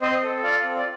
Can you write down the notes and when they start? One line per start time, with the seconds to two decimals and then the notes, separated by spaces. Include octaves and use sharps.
0.01 C4 C5 D#5
0.23 A4
0.43 F4 D5 F5
0.64 C4
0.75 D5